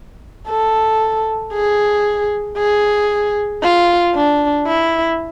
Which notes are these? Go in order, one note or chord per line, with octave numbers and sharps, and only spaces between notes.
A4
G#4
G#4
F4
D4
E4